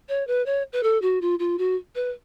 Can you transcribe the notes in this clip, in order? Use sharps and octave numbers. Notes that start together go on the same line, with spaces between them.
C#5
B4
C#5
B4
A4
F#4
F4
F4
F#4
B4